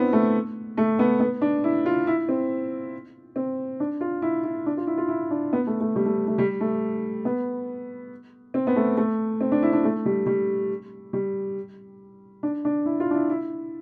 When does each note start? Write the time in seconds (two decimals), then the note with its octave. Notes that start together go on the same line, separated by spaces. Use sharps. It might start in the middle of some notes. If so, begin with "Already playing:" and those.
Already playing: B3 C4 D4 E4
0.13 A3
0.77 A3
0.99 B3
1.20 B3
1.42 D4
1.64 E4
1.86 F4
2.07 E4
2.29 C4
3.36 C4
3.80 D4
4.01 F4
4.22 E4
4.44 E4
4.66 D4
4.77 F4
4.87 E4
4.98 F4
5.08 E4
5.31 D4
5.53 B3
5.67 A3
5.80 A3
5.96 G3
6.06 A3
6.27 A3
6.38 G3
6.61 A3
7.25 B3
8.54 C4
8.67 B3
8.76 A3
8.97 A3
9.41 C4
9.52 D4
9.62 E4
9.73 D4
9.84 A3
10.06 G3
10.26 G3
11.13 G3
12.43 D4
12.65 D4
12.86 E4
13.00 F4
13.11 D4
13.14 E4
13.30 E4